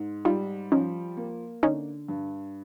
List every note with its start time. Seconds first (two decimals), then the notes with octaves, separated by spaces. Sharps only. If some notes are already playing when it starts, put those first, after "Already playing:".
Already playing: G#2
0.25 G3 D#4 F4
0.72 F3 C#4 D#4
1.17 A#3
1.63 D3 C#4 D#4
2.08 G2